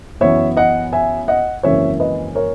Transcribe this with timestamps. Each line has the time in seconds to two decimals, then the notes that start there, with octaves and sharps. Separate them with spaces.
0.21 F#2 E3 B3 C#5 E5
0.57 D#5 F#5
0.93 E5 G#5
1.28 D#5 F#5
1.63 G#1 F#2 C#3 E3 A#3 C#5 E5
2.00 B4 D#5
2.35 A#4 C#5